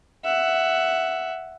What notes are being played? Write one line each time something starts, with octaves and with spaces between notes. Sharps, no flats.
E5 F#5